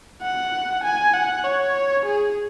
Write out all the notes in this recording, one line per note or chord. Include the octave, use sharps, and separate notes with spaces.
F#5
G#5
F#5
C#5
G#4